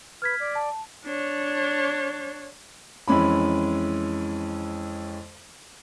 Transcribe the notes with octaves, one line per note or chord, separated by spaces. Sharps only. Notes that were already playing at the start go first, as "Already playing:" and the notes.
B4 F6 G#6 B6
D5
A5
D4 C#5
F2 E3 G#3 C#4 B5